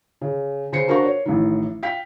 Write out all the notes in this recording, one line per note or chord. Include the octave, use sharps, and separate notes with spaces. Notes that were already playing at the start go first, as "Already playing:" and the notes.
C#3
C#3 C5 C7 C#7
D4 F#4 A#4 C5 F5 C#6
C#5
A1 A2 D#3
F5 G5 B6